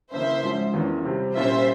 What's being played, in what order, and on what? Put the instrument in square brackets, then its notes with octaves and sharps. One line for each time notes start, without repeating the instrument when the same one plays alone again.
[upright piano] C#3 E3 A#3 C#4 [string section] C5 E5
[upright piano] G#2 F3 G#3 C#4
E2 E3 A#3 C#4 F4
C3 G3 C4
[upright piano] A#2 G3 C#4 F4 [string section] C5 E5